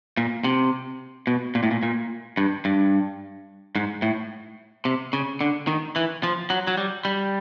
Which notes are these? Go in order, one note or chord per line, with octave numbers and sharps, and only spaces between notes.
A#2
C3
B2
A#2
A2
A#2
A#2
G2
G2
G#2
A2
C3
C#3
D3
D#3
E3
F3
F#3
F#3
G3
G3